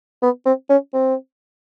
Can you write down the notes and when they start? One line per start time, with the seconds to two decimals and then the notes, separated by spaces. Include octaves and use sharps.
0.23 B3
0.45 C4
0.70 C#4
0.94 C4